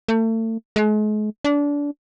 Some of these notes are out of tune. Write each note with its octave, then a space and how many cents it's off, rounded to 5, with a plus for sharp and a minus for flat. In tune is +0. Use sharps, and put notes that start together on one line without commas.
A3 +35
G#3 +40
D4 -25